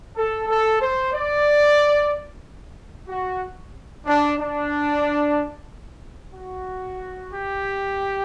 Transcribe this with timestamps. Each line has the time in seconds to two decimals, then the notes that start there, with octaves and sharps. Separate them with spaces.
0.16 A4
0.49 A4
0.81 C5
1.13 D5
3.08 F#4
4.05 D4
4.39 D4
6.34 F#4
7.31 G4